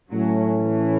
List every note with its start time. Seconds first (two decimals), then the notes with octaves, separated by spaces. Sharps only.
0.10 A2 F#3 A3 C#4
0.57 E3